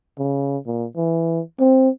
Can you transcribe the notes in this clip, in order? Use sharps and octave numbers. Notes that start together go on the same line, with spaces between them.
C#3
A#2
E3
C4